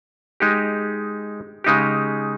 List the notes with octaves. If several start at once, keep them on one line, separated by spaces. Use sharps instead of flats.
G#3 D#4 G4
C#3 G#3 D#4 G4